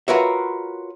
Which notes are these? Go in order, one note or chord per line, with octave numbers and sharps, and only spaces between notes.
F4 F#4 A#4 B4 C#5 E5